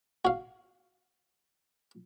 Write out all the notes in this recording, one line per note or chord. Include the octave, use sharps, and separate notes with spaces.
F#4 F5